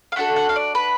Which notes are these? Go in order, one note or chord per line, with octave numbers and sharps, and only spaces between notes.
F5
A3 D4 F#4 A4 F#5
F#5
F5
D5
B4